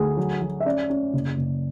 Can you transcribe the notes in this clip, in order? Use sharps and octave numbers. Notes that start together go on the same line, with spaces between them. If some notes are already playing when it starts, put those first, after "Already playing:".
Already playing: D2 G#4
F#3
F#3
E5
C#4 D5
C#4
F#1
F#1